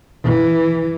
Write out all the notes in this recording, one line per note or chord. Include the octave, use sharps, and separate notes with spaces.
E3